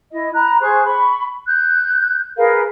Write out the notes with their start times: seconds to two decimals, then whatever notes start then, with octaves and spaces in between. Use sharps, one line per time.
0.11 E4 D#5
0.34 A#5 B5 F#6
0.60 G#4 C5 C#6 F#6
0.85 B5 C#6
1.47 F#6 G6
2.37 G#4 A#4 B4 F5